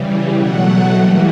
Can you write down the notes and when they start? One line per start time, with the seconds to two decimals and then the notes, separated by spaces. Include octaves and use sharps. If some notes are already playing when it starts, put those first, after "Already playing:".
Already playing: C#3 E3 G3
0.33 B2 F#3 A3 F#5
0.93 C#3 E3 G3 A#3